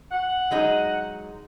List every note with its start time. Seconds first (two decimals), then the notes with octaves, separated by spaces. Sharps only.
0.11 F#5
0.51 F#3 G#3 D#4